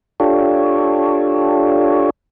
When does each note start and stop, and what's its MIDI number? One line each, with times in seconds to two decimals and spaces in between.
0.20 2.10 62
0.20 2.10 65
0.20 2.10 67
0.20 2.10 69
0.20 2.10 73